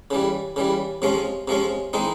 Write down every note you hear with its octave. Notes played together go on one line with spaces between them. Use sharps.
C#3 E3 G3
C#3 E3 G3
C3 F3 G#3 C#4
C3 F3 G#3 C#4
E3 G#3 C4 D#4